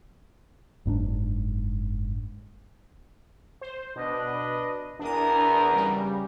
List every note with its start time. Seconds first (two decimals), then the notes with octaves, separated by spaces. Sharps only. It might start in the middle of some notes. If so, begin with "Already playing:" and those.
0.85 F#1 G#2 C4 D4
3.61 C5
3.96 B2 D4 B4 D#5
4.99 E2 D4 A#4 D#6
5.73 C#3 G3